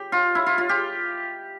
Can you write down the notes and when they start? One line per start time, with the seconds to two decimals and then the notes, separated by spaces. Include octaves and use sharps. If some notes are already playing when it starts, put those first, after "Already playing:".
Already playing: G4
0.12 F4
0.35 E4
0.46 F4
0.58 F4
0.69 G4